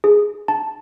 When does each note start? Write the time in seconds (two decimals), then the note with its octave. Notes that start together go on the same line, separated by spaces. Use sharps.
0.04 G#4
0.48 A5